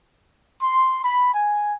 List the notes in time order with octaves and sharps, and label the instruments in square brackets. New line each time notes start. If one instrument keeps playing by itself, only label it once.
[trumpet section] C6
B5
G#5